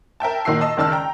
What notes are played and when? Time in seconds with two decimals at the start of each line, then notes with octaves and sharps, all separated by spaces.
0.20 A#4 E5 G5 A5
0.45 A#2 D#3 F#4 E6 C7
0.61 D#5 A5 E6
0.77 C#2 D#3 D5 A5 E6 F6
0.92 G5 A#5